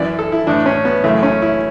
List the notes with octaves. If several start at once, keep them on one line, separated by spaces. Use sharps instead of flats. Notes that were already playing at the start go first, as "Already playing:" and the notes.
Already playing: F#2 E3 D5
A4
E4
A2 E3 D4
C#4
B3
F#2 C#3 E3 A3
C#4
E4